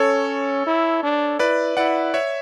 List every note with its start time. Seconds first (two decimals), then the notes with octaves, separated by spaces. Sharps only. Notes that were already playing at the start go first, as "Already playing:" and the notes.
Already playing: C#4 A4 C#5
0.67 E4
1.03 D4
1.39 E4 B4 D5
1.77 E4 D5 F#5
2.14 C#5 E5